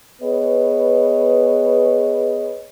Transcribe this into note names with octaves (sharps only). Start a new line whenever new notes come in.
B3 G#4 B4 C#5 D#5